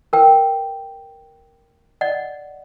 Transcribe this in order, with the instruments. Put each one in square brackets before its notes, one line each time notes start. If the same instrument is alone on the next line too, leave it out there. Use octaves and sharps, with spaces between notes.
[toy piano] A#4 B4 G5
D5 D#5 F#5